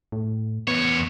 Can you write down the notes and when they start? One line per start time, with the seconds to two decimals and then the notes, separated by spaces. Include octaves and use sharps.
0.12 A2
0.67 E2 B3 C#5